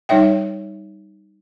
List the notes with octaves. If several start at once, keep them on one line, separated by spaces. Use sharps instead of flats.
G3 D#4 C#5 E5 G5